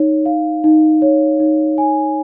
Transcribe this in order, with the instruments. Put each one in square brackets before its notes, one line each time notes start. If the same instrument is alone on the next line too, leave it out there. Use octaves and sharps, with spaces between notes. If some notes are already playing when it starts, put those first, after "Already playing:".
Already playing: [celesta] D#4 C#5
F5
D#4
C#5
D#4
G#5